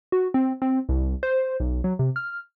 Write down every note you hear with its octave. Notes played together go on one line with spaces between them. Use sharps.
F#4
C4
C4
C2
C5
B1
F#3
C3
F6